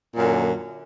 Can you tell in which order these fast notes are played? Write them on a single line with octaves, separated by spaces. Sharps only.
A#2 F#2 D3